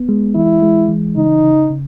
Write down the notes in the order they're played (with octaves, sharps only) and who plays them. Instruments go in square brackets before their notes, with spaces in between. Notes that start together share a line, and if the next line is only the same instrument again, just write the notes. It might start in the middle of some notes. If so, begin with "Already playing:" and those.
Already playing: [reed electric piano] B3
G#3
[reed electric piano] E3 [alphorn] E4
[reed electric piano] G#3
E3
[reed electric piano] C#3 [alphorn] D#4
[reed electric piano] C#3
C#3